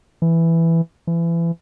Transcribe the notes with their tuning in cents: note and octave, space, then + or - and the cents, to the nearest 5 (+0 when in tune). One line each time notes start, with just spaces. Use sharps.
E3 +5
E3 +30